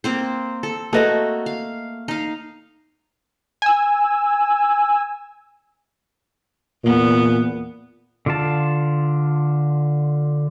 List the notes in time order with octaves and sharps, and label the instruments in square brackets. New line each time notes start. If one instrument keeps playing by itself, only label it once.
[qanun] A#3 C4 C5
A4
[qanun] A3 A#3 F#4 [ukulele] A4 B4 D#5
[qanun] F5
D#4 F5
[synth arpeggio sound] G#5 E6
[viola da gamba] E2 B3 [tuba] A#2
[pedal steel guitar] D3 F4 A5